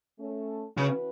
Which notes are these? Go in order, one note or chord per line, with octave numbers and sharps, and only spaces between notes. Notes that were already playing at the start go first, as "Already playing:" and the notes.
A3 C#4 A4
C#3 E3 C#4 F#4 B4